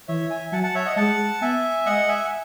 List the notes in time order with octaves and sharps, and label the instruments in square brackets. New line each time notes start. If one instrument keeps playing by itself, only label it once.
[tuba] E3 [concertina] C#5 E5
[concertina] E5 G#5
[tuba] F#3 [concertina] F#5 A5
[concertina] F#5 A5
C#5 E5
D#5 F#5
[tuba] G#3 [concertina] F#5 A5
[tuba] B3 [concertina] E5 G#5
[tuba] G#3 [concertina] D#5 F#5
[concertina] E5 G#5
F#5